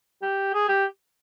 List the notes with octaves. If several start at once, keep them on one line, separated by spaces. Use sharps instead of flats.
G4
G#4
G4